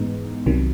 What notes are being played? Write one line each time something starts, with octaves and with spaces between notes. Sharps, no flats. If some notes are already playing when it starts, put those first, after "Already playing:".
Already playing: G#2 E3 G#3 B3 D#4
C2 C3 D#3 F#3